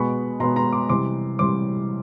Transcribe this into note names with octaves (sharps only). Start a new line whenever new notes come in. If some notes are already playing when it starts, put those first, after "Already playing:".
Already playing: B2 G#3 B3 B5 C#6
B2 G#3 B3 A#5 C6
A#5 C6
C6 D6
C3 E3 G3 C6 D6
C3 E3 G3 C6 D6